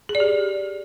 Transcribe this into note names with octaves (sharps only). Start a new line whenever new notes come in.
G#4
D5
G4